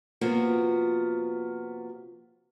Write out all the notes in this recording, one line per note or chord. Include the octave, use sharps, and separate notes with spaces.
C3 F3 A#3 B3 F4 F#4